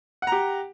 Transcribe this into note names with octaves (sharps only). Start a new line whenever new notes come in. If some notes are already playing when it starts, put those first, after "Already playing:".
G4 F#5 A#5